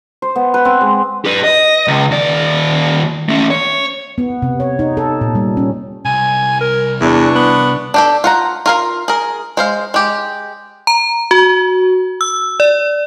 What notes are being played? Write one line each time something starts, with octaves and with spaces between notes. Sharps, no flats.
C5
B3
B4
C4
G#3
G4 B4
D#5
C#2
D#2 D5
A3 C#4
C#5
B3
C3
C#5
D#4
A4
A#2
G3
C#4
C2 G#5
A#4
E2 E3 D4 C#6
B3
D4 G4 A4
F4 F#5 A#5
F4 A#4 F5
G#4 A#4
G#3 C5 F5
G#3 G4
A#5
F#4
E6
D5